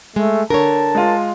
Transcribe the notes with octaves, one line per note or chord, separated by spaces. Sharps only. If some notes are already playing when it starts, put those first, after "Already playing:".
G#3 A3
D3 A#4 C#5 A5
G#3 F4